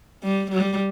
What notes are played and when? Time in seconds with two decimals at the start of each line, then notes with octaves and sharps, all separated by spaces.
0.23 G3
0.52 G3